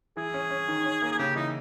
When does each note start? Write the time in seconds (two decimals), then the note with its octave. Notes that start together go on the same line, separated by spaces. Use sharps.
0.17 E3 G#4
0.34 C#4
0.50 C#4
0.68 D#3
0.85 C#4
1.02 A#3
1.12 G#4
1.18 C#3 G4
1.36 E3 D#4